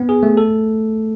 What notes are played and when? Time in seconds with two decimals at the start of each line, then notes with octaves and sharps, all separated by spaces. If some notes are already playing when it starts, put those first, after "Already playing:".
Already playing: B3
0.09 G#4
0.23 A3
0.37 A4